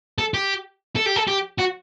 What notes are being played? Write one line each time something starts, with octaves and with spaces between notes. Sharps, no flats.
A4
G4
A4
G4
A4
G4
F#4